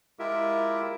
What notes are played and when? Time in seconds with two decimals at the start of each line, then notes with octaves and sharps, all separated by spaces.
0.19 G#3 E4 F4 G4 A#4 E5